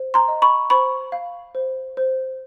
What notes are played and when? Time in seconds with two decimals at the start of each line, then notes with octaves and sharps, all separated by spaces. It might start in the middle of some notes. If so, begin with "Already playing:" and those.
Already playing: C5
0.14 A#5 C6
0.28 D#5
0.42 B5 C#6
0.70 C5 B5 C#6
1.12 F5
1.55 C5
1.97 C5